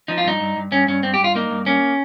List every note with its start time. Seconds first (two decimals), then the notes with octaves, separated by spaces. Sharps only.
0.08 F3 D#4
0.18 F4
0.24 G2 D#4
0.40 G2
0.56 G2
0.72 G2 C#4
0.88 G2 C#4
1.03 G2 C4
1.14 G4
1.19 G2
1.24 F4
1.35 A#3 D#4
1.51 G2
1.66 A#3 C#4